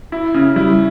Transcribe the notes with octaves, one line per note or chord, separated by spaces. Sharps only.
E4
C#3
G3 E4